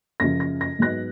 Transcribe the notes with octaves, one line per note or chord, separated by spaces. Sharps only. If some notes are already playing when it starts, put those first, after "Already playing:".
F#2 C#3 F3 A#6
A#6
A#6
G#2 F#3 B3 D#4 F#6 A#6